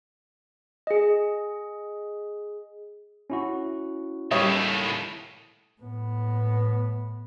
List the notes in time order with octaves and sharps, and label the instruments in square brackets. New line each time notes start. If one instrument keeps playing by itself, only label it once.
[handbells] G#4 D#5
[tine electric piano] C#4 E4 F#4
[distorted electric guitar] D#2 A2 [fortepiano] G3 C#5 D#5
[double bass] A2 B3